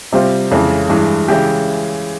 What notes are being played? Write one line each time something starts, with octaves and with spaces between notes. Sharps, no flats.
C3 G3 C4 F4
F2 C#3 E3 G#3
G2 E3 G#3
C#3 E3 G#3 E4 G4